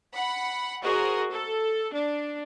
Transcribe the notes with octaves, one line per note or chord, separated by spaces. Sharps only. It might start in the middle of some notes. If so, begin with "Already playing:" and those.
F#5 B5
F#4 G#4 A#4 C5 D#5
A4
D4